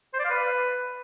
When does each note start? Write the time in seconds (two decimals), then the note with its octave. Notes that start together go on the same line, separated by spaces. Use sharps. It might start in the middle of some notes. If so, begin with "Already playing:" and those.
0.14 C5
0.19 D5
0.25 F5
0.30 B4